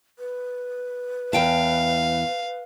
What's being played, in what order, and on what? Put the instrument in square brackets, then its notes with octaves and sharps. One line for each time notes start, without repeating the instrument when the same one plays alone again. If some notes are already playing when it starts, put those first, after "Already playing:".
[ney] B4
[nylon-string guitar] E2 G5 A5 [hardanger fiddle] F5